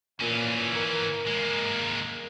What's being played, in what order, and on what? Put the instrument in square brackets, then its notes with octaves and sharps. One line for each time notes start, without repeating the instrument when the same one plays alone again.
[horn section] A#2 [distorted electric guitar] E3 C#4
[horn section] A#4
[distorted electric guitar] G#3 A#3